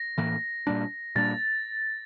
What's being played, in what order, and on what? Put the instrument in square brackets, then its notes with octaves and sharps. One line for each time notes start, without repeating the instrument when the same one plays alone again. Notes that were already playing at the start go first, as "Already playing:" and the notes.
Already playing: [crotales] A#6
[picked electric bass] A2 E3 A#3
A#2 G3 A#3 D4
[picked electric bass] A#2 G3 A#3 D4 [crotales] A6